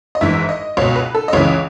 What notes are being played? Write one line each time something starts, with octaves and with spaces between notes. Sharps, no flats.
D#5
G#1 G#2 E3 E5
D#5
C#2 B2 C#5
B4
A4
D#5
C#2 C#3 E3 C#5